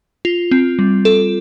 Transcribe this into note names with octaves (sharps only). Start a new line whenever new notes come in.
F4
C4
G3
A4